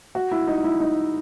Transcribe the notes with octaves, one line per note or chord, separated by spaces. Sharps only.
F#4
E4
D#4
E4
D#4